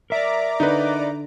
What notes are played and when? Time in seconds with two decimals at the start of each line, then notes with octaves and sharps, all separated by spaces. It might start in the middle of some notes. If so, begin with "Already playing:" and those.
0.10 A#4 D5 E5 A#5 D6
0.60 D3 D#4 B4